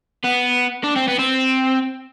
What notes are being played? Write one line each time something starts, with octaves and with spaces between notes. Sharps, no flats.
B3
D4
C4
B3
C4